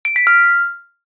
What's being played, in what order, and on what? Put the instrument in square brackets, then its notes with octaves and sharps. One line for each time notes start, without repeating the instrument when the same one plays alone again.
[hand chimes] D7
B6
F6